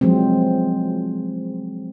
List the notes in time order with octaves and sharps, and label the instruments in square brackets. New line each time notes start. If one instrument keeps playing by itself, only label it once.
[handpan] F3 F#3 G#3 C4